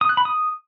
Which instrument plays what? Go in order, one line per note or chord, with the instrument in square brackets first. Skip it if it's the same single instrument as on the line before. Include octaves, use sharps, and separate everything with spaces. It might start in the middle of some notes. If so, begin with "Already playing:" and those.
[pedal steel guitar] D#6
F#6
B5
D#6